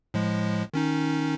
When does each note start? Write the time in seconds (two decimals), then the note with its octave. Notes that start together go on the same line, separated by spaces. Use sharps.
0.14 A2 F3 G#3
0.74 D#3 C#4 D#4